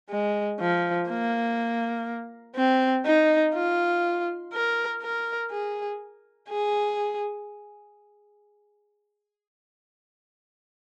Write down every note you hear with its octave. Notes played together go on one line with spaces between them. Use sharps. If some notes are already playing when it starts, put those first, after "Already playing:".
G#3
F3
A#3
C4
D#4
F4
A#4
A#4
G#4
G#4